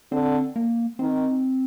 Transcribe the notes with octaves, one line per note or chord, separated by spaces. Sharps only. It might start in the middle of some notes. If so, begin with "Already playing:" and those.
D3 C4
A#3
D#3 C4